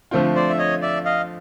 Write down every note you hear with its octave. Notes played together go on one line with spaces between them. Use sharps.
D3 F3 A3 C4 F4
C5 D5
E5
C#5 D#5
D5 E5
D#5 F5